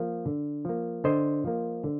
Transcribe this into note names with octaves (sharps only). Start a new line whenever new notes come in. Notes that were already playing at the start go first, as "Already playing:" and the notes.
Already playing: F3 A#3
D3
F3 A#3
D3 C5 D#5
F3 A#3
D3